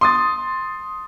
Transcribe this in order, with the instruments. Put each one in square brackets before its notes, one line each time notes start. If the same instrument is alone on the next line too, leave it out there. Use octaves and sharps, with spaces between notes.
[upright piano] C6 D#6 A6